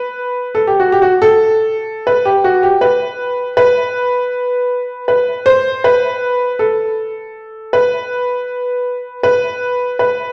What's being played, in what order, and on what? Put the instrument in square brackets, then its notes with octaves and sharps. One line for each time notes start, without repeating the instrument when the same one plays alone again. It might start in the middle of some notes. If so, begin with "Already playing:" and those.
Already playing: [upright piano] B4
A4
G4
F#4
G4
F#4
A4
B4
G4
F#4
G4
B4
B4
B4
C5
B4
A4
B4
B4
B4